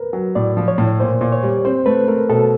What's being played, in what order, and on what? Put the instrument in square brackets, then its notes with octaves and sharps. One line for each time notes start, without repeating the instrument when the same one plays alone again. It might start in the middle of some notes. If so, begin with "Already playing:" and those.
Already playing: [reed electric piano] A#4 B4
[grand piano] F#3
[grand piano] A2 [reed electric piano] D5
[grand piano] F3
[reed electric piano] C#5
[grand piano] A2
[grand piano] A#2 [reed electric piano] C5
[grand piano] A#2
[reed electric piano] C#5
[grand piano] G3
[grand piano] C4 [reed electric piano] C5
[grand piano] A3 [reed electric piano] B4
[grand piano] A3 [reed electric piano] A#4
[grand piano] B2 [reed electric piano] A4